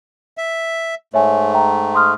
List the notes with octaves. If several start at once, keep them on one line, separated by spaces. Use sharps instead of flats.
E5
G#2 A3 C#5 E5 G#5
E5 G5 A#5
C6 D#6 F6